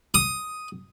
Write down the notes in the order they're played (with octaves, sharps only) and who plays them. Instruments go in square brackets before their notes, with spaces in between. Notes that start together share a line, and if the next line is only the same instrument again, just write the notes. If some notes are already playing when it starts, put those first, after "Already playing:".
[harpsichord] D#6